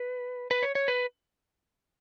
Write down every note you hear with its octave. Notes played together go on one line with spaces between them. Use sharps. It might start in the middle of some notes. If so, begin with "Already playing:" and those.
Already playing: B4
B4
C#5
C#5
B4